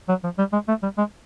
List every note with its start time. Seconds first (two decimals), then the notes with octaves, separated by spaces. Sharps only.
0.09 F#3
0.24 F3
0.38 G3
0.53 G#3
0.68 A3
0.83 G3
0.98 G#3